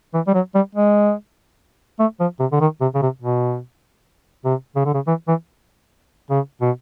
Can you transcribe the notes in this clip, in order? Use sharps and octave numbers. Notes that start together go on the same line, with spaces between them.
E3
G3
F#3
G3
G#3
A3
F3
C3
D3
D#3
C3
C#3
C3
B2
C3
C#3
D3
C#3
E3
E3
C#3
B2